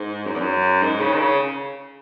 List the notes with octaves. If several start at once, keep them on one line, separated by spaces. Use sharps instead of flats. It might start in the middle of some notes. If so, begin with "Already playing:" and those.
Already playing: G#2
F#2
E2
F#2
G#2
C#3
D#3
C#3